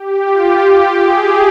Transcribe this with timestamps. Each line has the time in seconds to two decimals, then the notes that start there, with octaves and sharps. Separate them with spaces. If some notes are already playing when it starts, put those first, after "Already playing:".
Already playing: G4
0.25 F4
0.60 G4
0.94 G#4